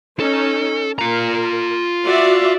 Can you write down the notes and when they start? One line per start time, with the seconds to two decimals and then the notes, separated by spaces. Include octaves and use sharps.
0.20 C#4 D#4 A4
0.99 F4 A#4 A#5
2.06 F#4 D5 E5